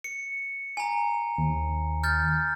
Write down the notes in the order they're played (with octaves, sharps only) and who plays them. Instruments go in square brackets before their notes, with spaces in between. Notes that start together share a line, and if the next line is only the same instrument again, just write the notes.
[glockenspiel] C#7
G#5 A#5
[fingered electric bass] D#2
[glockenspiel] F6 G6 A6